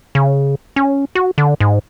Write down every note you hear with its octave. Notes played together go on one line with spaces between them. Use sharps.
C#3
C#4
F#4
D3
G#2